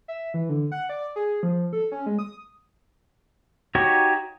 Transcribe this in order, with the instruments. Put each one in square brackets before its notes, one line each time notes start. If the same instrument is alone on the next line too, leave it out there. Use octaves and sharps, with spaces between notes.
[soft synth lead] E5
E3
D3
F#5
D5
G#4
F3
A4
C#4
G#3
D#6
[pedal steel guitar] D#4 F#4 G4 C#5